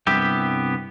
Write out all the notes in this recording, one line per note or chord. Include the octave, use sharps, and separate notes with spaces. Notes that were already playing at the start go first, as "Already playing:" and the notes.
C2 G2 B3 G4 E5